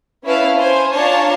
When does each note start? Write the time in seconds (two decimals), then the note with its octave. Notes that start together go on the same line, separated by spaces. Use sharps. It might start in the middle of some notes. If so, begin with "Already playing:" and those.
0.25 C#4 E4 B4 F5 A5
0.58 C5 G#5
0.94 D4 F4 C#5 F5 A5 A#5